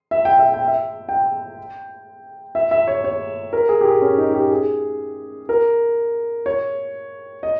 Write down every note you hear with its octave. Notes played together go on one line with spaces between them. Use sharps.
E5
G5
E5
G5
E5
G5
E5
E5
C#5
C#5
A#4
G#4
G4
G#4
C#4
D#4
G4
G#4
A#4
C#5
D#5